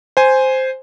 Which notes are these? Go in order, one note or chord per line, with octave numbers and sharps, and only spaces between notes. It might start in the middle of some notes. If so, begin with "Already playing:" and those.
C5 G#5